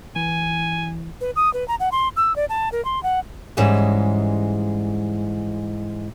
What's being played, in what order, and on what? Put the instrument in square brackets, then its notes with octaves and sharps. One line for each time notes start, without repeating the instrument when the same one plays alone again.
[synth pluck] E3 [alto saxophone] G#5
[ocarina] B4
D#6
B4
A#5
F#5
C6
E6
D5
A5
A#4
C6
F#5
[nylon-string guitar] G#2 E3 G3 G#3 C#4